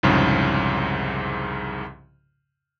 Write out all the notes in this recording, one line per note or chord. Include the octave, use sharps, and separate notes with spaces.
C2 F2 G#2 C#3